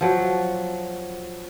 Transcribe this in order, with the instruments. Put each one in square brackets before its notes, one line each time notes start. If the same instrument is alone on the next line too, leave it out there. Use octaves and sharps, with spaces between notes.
[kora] F3 F#3